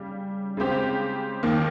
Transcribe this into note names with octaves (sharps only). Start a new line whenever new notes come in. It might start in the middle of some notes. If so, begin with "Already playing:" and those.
Already playing: C#3 G3
C#3 G#3 C4 G4
D#2 D#3 A#3